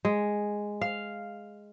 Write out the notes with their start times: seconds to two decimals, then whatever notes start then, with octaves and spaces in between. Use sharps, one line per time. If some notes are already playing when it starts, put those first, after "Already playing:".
0.05 G#3
0.81 F5